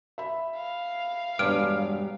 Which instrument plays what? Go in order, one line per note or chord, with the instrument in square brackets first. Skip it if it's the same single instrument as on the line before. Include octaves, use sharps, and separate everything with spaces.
[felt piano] E5 B5
[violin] F5
[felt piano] E1 B4 [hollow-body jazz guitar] G2 [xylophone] F6 D7